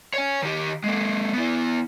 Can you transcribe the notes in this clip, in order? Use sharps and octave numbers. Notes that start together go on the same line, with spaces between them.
C#5 G#5
D#3 G4
G#3 A#3
B3 E4